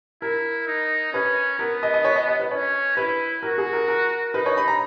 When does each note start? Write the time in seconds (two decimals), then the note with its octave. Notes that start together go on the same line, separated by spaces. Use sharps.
0.22 E4 A#4
0.67 D#4
1.13 C#4 B4
1.59 B3 A#4
1.83 D#5
1.94 D#5
2.04 C#5
2.16 D#5
2.28 D#5
2.40 B4
2.51 C#4 C#5
2.96 E4 B4
3.43 F#4 A#4
3.58 G#4
3.73 A#4
3.88 A#4
4.34 D#4 B4
4.46 C#5
4.57 B5
4.68 A#5